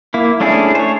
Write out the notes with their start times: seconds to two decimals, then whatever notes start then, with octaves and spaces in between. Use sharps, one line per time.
0.14 A#3 E4
0.40 A3 C#4 D4 E4 G#4
0.75 C5 C#5